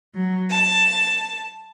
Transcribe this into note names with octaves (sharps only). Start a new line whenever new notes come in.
F#3
A5